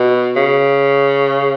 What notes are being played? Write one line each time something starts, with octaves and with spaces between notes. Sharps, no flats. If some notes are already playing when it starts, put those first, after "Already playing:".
Already playing: B2
C#3